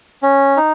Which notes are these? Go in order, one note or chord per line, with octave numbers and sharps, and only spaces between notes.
C#4
D#4